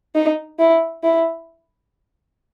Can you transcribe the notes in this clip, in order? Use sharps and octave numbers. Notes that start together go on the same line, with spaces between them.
D#4
E4
E4